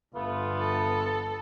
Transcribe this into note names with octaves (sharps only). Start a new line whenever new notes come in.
G1 A3 B3 F4
A4